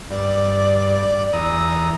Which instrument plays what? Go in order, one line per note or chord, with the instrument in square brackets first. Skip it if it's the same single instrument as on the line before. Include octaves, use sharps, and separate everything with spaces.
[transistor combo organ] G2 [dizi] D5
[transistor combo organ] E2 A#5 D#6 [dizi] E6